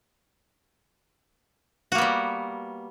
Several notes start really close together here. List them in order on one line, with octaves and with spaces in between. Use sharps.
F#4 A#3 B3 G3